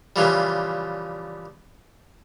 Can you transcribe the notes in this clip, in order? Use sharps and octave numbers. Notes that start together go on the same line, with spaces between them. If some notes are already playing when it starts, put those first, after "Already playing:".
A#2 C#3 E3 F3 G3